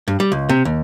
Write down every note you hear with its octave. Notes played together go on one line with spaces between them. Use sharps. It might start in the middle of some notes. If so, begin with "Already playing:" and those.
G2
G3
C#2
C3
D#2